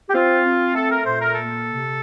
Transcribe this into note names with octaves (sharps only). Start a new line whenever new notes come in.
G4
C4 F4
C4
A3 A4
A#4
A#2 C5
A#4
A#3 A4
C3